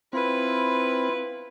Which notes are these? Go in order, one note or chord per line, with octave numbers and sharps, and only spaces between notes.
C4 E4 F4 B4